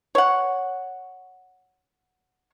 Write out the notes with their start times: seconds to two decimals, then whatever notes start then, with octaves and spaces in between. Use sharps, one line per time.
0.15 C#5 F#5